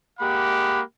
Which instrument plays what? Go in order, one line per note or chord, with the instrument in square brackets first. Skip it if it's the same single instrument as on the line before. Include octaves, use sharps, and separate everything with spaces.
[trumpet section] G#3 A#3 G4 F#5 B5